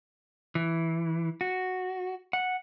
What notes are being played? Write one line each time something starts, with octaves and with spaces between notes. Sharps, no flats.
E3
F#4
F#5